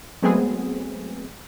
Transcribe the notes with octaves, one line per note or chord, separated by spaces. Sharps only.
F#3 G#3 A3 B3 C4 G#4